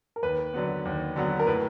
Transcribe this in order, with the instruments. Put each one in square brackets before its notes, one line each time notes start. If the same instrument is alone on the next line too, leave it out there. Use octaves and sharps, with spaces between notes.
[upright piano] A#4
[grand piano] D#2 [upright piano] B4
[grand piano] D3 F#3 B3
D#2
D3 F#3 B3
[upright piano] A#4
[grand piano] A2 [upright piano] B4